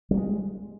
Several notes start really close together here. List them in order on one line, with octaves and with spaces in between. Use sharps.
G3 A#3 G#3